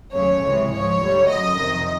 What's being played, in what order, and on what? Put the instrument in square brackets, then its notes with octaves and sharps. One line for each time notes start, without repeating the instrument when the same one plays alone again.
[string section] D#2 C#3 F#3 A3 C#5
C#2 C3 E3 G#3
G#2 F3 G#3 C#5
D2 D3 G3
F#2 D3 F#3 D#5
F2 C3 D#3